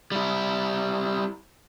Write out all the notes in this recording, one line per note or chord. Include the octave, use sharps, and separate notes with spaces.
G3 E4